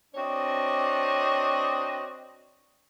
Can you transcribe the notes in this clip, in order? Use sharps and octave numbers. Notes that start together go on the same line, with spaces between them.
C4 D4 F#4 C#5 D#5